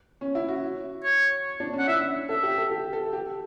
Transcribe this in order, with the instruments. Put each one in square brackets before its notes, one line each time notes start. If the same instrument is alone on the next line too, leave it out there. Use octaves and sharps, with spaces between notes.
[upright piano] C#4
E4
F#4
[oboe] C#5
[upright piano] D4
C#4
[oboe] F#5
[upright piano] E4 [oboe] E5
[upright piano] A4 [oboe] E5
[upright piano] G4
A4
G4
A4
G4